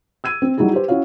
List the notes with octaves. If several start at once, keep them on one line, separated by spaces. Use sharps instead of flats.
E6 G#6 D#7
C4
F#3 G3 D#4 E4 G#4
G4 B4 C5
C#4 E4 F#4 C#5 F5